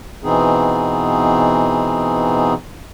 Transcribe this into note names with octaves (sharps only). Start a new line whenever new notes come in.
B2 E3 B3 C4 D#4 G#4